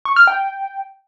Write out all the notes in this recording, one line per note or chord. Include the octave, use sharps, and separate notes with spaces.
C#6
F6
G5